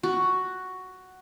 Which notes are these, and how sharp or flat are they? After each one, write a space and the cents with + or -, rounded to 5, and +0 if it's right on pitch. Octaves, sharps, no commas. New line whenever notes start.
F#4 +5